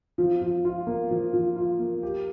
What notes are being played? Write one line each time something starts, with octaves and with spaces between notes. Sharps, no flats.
F3
F3
F4
A#3
F3
F3
F4
A#3
G4